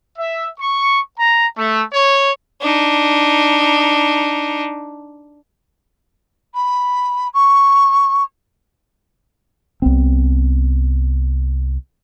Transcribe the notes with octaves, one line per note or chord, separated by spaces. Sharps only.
E5
C#6
A#5
A3
C#5
D4 D#4
B5
C#6
C2 B3 C4